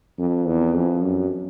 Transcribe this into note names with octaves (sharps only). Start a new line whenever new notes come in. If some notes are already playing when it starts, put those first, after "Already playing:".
F2
E2
F2
F#2